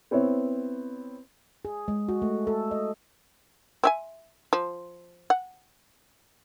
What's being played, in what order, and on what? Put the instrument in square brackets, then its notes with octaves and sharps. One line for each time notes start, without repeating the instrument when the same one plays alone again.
[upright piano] B3 C4 E4 C#5
[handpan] G#4
G#3
F#4
A3
A4
D#5
[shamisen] C4 E5 G#5
F3
F#5